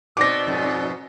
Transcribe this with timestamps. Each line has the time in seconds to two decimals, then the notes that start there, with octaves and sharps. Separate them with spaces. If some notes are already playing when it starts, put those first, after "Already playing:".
0.17 B2 A#3 C4 D#4 D5 D6 E6 A#6
0.47 F2 G#2 B2